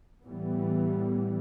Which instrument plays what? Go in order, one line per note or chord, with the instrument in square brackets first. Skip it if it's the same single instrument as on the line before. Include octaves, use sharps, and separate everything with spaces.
[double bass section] A2 E3 G3 B3